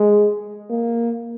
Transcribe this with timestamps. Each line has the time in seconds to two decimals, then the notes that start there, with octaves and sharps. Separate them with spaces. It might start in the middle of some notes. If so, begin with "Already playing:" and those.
Already playing: G#3
0.70 A#3